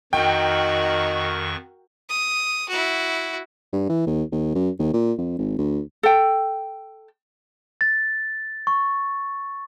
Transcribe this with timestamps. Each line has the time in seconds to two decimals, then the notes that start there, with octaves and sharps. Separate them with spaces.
0.13 F2 D#3 D#4 F#4 A#4 G5 C#6
2.09 D#6
2.69 E4 F#4
3.72 G2
3.89 E3
4.06 D#2
4.32 D#2
4.55 F#2
4.79 D#2
4.93 A#2
5.18 F2
5.39 G#1
5.58 D2
6.03 A4 G5
7.81 A6
8.67 C#6